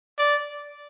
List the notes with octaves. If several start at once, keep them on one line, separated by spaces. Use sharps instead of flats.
D5